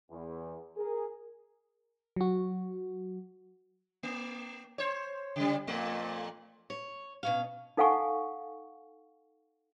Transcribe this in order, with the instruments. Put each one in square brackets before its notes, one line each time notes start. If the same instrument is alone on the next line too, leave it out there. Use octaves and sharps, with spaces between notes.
[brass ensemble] E2
G#4 A#4
[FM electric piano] F#3 F#4
[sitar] A#3
C5 C#5
C#3 G3
F2 A#2 A3
[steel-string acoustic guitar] C#5
B2 C#4 F5
[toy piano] D#4 A4 F5 F#5 G#5 C#6